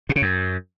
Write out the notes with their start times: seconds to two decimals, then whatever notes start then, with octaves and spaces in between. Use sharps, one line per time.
0.09 A#2
0.16 C#3
0.22 F#2